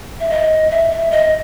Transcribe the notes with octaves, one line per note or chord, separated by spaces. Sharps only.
E5
D#5
E5
E5
D#5